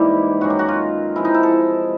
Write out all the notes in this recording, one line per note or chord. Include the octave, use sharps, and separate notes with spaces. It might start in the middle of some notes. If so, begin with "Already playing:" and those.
Already playing: G#2 E3 G3 A#3 E4 G4
F#2 D#3 G#3 F#4
G4
F#4
F4
C3 F3 G#3 E4
D#4
E4
A4